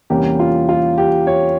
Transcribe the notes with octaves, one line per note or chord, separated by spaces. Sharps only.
E2 C3 G3 A#3 C#4 G4
F4
F4
G4
C#5